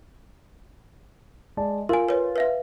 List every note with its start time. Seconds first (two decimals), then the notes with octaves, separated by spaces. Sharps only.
1.57 G#3 D5 A5
1.89 F4 A#4 G#5
2.09 B4 C#5
2.36 B4 E5 F5